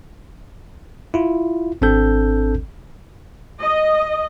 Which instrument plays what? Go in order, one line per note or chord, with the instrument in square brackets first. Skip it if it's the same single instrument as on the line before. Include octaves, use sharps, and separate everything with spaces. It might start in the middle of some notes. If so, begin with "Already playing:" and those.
[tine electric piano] E4 F4
G#1 C4 D4 A4 G6
[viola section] D#5